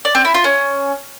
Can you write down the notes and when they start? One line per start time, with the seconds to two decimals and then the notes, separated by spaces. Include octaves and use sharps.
0.05 D5
0.15 C4
0.25 E4
0.34 F4
0.44 C#4